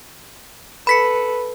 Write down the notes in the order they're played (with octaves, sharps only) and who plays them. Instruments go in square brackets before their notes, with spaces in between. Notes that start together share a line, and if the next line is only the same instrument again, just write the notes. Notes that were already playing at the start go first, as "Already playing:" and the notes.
[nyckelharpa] A4 B4 [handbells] B5 B6 C#7